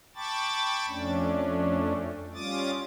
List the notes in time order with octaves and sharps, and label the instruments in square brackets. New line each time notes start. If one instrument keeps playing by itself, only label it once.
[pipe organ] G5 A5 B5 C#6 D6 A6
F2 A3 C#4 D4
G3 C#4 F4 D6 D#6 A6